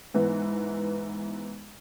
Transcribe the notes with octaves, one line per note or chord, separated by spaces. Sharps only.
G#2 E3 B3